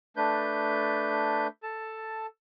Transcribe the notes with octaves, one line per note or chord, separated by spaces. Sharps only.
A3 D4 B4 G6
A4 A5